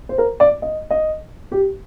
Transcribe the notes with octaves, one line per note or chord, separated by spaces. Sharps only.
C5
A#4
D5
D#5
D#5
G4